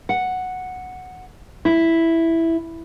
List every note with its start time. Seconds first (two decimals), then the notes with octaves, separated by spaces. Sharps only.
0.09 F#5
1.65 E4